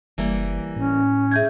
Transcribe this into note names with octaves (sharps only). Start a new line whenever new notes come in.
F#1 E3 G3 A#3
A2 C#4
E4 G#4 E5 G6 G#6